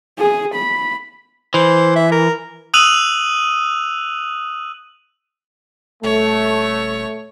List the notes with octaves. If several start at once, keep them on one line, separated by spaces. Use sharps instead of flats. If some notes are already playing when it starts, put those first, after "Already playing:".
G#4
B5
E3 C5
E5
A#4
D#6 E6 F#6 D#7 F7 F#7
D#1 A3 C#5